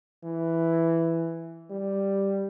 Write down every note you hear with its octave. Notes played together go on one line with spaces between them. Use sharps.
E3
G3